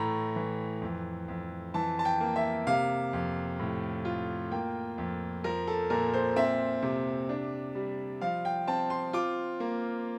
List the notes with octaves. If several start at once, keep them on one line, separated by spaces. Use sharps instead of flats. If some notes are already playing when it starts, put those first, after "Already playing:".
Already playing: A2 E3 A3 A#5
E3
F2
F2
E3 A5
A5
G5
A#3
E5
C3 F5
F2
A2
F4
A#3 G5
F2
F3 A#4
A4
A#2 A#4
C5
C4 E5
C3
D4
G3
F3 F5
G5
C4 A5
C6
F4 D6
A#3